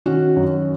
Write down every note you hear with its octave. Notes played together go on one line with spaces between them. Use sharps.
D#3 C#4 F#4
F#2